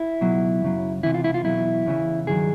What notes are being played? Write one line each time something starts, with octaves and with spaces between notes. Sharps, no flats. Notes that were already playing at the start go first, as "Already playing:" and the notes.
Already playing: E4
C#2 B2 F#3
F#2 C#3 F#3
E2 C3 E3 E4
F4
E4
F4
E2 B2 F#3 E4
E2 C#3 E3
G2 D#3 F#3 G#4